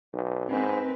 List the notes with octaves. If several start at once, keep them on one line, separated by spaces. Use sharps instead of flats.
B1
G#2 C4 A#4 B4